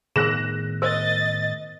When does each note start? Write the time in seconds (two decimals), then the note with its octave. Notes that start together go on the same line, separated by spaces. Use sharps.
0.16 A2 D#3 B3 G#4 A#4 F#6 A#6 E7
0.82 A#4 C5 D#5 A6